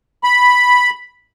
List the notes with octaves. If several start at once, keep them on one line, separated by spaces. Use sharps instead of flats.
B5